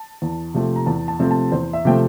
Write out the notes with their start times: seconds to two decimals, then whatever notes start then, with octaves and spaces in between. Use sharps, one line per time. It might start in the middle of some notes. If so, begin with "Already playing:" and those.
Already playing: A5
0.22 E2
0.54 C3 F3 A3 C4
0.76 A#5
0.86 E2 A5
1.08 A5
1.19 C3 F3 A3 C4
1.31 A5
1.52 E2 C5
1.73 E5
1.85 C3 F3 A3 C4 G5